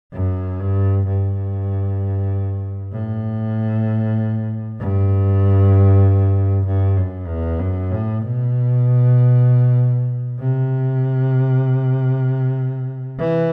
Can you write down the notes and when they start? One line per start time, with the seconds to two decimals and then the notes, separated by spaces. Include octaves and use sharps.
0.13 F#2
0.61 G2
1.07 G2
2.92 A2
4.79 G2
6.66 G2
6.97 F#2
7.28 E2
7.60 F#2
7.91 A2
8.22 B2
10.39 C3
13.19 E3